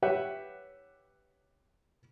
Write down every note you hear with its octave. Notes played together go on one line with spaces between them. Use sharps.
G4 B4 C#5 E5 F#5 G5